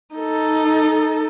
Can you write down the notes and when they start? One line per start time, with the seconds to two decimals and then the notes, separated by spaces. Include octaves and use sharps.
0.15 D#4 A4